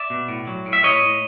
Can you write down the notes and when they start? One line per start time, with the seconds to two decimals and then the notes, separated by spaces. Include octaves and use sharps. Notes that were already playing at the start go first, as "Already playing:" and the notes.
Already playing: D5 E5
0.10 B2
0.29 A2
0.47 F#3
0.66 A2
0.73 E5
0.84 A2 C#5 D#5
1.02 A2